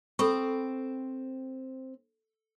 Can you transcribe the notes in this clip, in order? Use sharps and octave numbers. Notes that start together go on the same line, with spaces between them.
C4 A4 C5 G5 B5 C#6